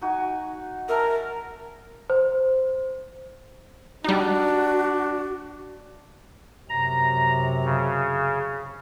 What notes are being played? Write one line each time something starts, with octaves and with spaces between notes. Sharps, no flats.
D#4 F#4 G#5
A#4 E5 G#5 A5
C5
G3 D4 D#4 F#4
F#2 C3 A#5
C#3